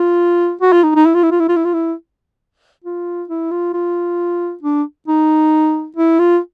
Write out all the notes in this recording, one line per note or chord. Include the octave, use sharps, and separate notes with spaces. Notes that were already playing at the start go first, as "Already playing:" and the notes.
Already playing: F4
F#4
F4
D#4
D#4
E4
F4
E4
F4
E4
F4
E4
F4
E4
F4
E4
F4
F4
D4
D#4
E4
F4